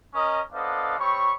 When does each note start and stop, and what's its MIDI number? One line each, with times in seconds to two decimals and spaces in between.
0.14 0.41 61
0.14 0.41 70
0.14 0.41 75
0.14 0.41 87
0.52 0.98 59
0.52 0.98 62
0.52 0.98 69
0.52 0.98 72
0.52 0.98 75
0.52 0.98 77
0.98 1.33 55
0.98 1.33 60
0.98 1.33 73
0.98 1.33 83
0.98 1.33 85